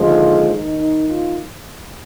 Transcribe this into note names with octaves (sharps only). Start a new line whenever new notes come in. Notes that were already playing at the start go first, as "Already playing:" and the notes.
Already playing: D#2 D3 F3 G#3
D#2 D#3 D#4
D#4
F4